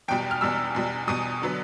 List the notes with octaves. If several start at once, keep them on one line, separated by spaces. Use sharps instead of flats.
E2 B2 G3 G5
F6
E2 B2 G3 E6
E2 B2 G3
E2 B2 G3 D#6
D3 F#3 B3